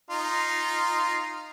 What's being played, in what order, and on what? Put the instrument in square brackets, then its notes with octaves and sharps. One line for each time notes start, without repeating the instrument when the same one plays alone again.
[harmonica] D#4 F4